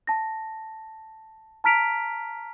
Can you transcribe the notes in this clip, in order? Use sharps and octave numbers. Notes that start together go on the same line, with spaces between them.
A5 A#6
A5 A#5 F6 B6 D7 F7